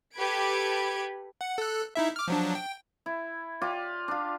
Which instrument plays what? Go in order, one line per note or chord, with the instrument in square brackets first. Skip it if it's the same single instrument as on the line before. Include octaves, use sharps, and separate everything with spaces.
[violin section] G4 A4 B4 B5 G#6 D7
[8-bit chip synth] F#5
A4 F#6
D#4 E4 E5
D6 F6
F3 F#3 D4
G5
[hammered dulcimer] E4
F4 G4 D5
D4 F4